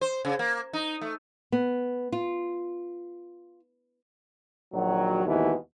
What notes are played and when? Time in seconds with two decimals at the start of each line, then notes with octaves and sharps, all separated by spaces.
0.01 C5
0.25 C#3
0.39 A#3
0.73 D#4
1.01 A3
1.52 B3
2.12 F4
4.73 A#1 D#3 F#3
5.26 D#2 G#2 B2 E3